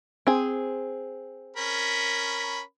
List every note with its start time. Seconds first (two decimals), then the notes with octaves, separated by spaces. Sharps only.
0.27 C4 G#4
1.56 C#4 A#4 B5